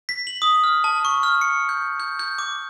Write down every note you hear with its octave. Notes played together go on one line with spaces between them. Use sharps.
B6
F#7
D#6
F6
A5
C#6
F6
C#7
G6
G6
G6
D6